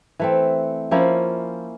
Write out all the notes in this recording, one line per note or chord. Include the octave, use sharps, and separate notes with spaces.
E3 A3 C4
F3 A#3 C#4 E4